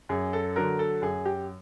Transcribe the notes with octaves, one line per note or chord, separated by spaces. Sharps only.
F#2 G#4
A4
D3 F#3 A#4
A4
F#2 G#4
G4